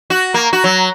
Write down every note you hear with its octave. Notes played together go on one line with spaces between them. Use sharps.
F#4
A#3
F#4
F#3